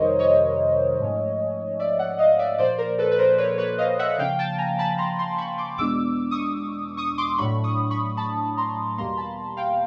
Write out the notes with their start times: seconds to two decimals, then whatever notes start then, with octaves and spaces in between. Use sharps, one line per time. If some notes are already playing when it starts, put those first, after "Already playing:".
Already playing: F2 C3 D#3 G3 A#4 C5 C#5 D#5
0.19 C#5 D#5
1.00 G#2 F3 A3 C#4
1.79 D5 E5
1.99 E5 F#5
2.18 D#5 F5
2.39 D5 E5
2.58 A#2 F3 A#3 C5 D5
2.78 A#4 C5
2.98 A4 B4
3.11 B4
3.18 A#4 C5
3.38 B4 C#5
3.58 B4 C#5
3.78 D#5 F5
3.99 E5 F#5
4.18 C#3 F3 A#3 C#4 F5 G5
4.39 G5 A5
4.58 G#5 A#5
4.79 A5 B5
4.98 A#5 C6
5.19 A#5 C6
5.38 B5 C#6
5.58 C6 D6
5.78 E2 B2 G#3 B3 D4 D6 E6
6.31 C#6 D#6
6.97 C#6 D#6
7.18 C6 D6
7.38 A2 F#3 A3 D4 B5 C#6
7.64 C#6 D#6
7.90 B5 C#6
8.17 A5 B5
8.57 A#5 C6
8.98 E2 B2 G3 A#3 A#5 C6
9.17 A5 B5
9.57 F5 G5